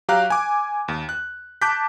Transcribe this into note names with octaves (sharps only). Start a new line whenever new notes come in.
F#3 G4 F5 A#5 F#6
G#5 D6
D#2
F#6
A5 D6 F#6 G6 B6